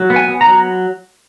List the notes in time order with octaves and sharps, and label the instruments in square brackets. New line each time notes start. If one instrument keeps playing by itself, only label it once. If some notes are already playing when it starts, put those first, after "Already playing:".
Already playing: [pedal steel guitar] F#3
B3
G#5
B3
A#5
F#3